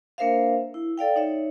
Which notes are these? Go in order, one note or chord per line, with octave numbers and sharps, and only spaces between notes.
A#3 D4 A#4 C5 E5 F5
E4
A4 D5 F5 G5
D#4 C#5 E5